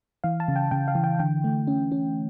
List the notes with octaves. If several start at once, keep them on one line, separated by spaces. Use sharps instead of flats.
E3 F5
A5
C#3
G5
C#3 G5
F5
E3
G5
D3 G5
A3
C#4
C#4